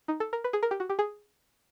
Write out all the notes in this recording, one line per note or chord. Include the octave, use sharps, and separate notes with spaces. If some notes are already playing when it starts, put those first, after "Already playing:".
D#4
A4
A#4
B4
G#4
A#4
G4
F#4
G4
G#4